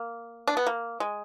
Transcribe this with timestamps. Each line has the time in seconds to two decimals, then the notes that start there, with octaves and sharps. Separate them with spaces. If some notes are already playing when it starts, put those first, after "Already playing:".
Already playing: A#3
0.48 D4
0.57 B3
0.67 A#3
1.00 G#3